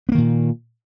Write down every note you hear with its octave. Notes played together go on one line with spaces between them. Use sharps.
A#2 D#3 A#3 B3